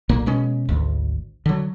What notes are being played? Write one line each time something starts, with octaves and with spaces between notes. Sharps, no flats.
B1 A#2 A#3
B2 G#3 C#4
G#1 D2
D3 F#3